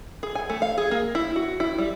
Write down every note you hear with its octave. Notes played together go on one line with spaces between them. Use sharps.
G#4
G#5
A3
F5
G#4
A#3
E4
F#4
E4
G3